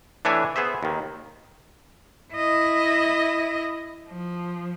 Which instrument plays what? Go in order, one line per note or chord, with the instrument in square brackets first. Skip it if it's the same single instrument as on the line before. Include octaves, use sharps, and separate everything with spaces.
[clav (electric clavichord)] E3 A3 D4 C#5 E5 G#5
B3 G#4 C5 E5
D#2 D#3
[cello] E4 D#5
F3